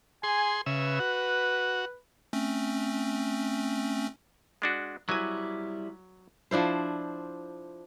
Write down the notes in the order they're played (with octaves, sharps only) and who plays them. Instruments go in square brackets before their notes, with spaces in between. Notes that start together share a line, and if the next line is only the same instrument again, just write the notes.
[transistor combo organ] G#4 C6 [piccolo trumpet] G#5
[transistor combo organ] C#3 E5 [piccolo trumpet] B4
[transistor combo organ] F#4
[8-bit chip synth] A3 C4 C#4
[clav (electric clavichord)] G#3 D4 F#4
[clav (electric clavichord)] F#3 G#5 [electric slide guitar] G3 E4
[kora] F3 D4 E4 C5